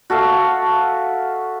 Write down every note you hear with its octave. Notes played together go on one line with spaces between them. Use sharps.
F#4 A4 E5 F5